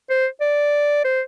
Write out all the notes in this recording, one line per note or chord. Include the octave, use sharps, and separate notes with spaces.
C5
D5
C5